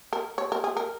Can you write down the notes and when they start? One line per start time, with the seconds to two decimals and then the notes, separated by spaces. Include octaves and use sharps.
0.13 A#4
0.38 C#5
0.52 A#4
0.64 G#4
0.77 A#4